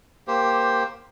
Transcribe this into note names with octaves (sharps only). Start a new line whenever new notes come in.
A#3 G4 C5